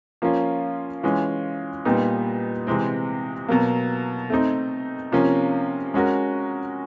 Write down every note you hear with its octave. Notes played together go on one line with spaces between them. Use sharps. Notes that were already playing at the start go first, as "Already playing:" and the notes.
F3 A#3 C#4 F4
E3 G#3 C#4 F4
A#2 G3 B3 D#4
C3 E3 G#3 C4
B2 F#3 A#3
A3 C4 D#4
C3 F3 A#3 C#4
G#3 C#4 F#4 A#4